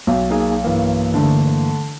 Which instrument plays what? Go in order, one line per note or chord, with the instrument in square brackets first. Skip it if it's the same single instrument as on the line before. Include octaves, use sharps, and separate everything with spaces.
[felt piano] B1
[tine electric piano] A#3 D#4 G#4
G2 E3 A#3
[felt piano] D3 A3